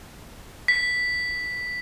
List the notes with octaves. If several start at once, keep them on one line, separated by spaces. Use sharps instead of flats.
B6